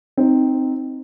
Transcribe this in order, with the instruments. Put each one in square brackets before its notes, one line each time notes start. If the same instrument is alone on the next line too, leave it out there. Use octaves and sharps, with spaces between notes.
[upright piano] C4 D#4